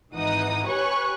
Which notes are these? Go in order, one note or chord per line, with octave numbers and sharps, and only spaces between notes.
G#1 E3 D#4 F#5 D#6
G4 B4 C#5 G#5 C#6 F#6